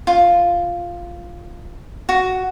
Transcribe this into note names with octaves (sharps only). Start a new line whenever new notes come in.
F4
F#4